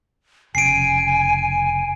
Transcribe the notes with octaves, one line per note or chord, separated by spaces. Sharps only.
F1 C#3 G#5 C7 D7